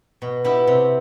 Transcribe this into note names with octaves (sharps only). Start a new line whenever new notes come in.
B2
B3 E4 G4
C3